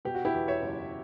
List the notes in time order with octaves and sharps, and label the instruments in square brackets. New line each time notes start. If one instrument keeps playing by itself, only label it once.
[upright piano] B2 G4
F#4
E4 G4
E2
C#5 E5
F#1